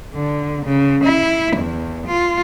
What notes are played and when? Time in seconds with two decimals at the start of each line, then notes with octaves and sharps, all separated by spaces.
0.15 D3
0.65 C#3
1.04 E4
1.57 E2
2.07 F4